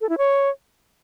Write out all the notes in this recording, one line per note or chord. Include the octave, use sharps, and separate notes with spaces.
A4
E4
C#5